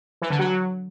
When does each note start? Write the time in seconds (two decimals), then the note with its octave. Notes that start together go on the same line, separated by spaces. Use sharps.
0.22 E3
0.30 D3
0.39 F#3